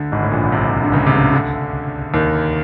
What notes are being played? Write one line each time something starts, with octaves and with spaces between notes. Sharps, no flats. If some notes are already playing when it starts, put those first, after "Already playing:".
Already playing: D2 D3
G#1 G#2
A2
A#1 A#2
C2 C3
D3
C#2 C#3
C3
C#2 C#3
D2 D3
D#2 D#3